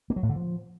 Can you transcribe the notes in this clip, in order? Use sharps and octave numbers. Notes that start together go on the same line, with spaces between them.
A#3
F#3
A2
D3
F3